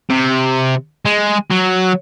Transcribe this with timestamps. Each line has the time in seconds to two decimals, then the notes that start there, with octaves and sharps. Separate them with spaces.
0.10 C3
1.06 G#3
1.50 F#3